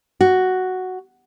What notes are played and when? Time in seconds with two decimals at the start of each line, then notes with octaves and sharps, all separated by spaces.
0.21 F#4